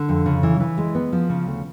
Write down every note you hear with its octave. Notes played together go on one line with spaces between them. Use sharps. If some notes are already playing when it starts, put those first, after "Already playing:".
Already playing: D3
F2
C#3
E3
E3
G#3
B3
F3
C#3
D2